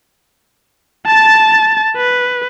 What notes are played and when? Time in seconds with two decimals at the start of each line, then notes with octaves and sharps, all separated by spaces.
1.06 A5 A6
1.96 B4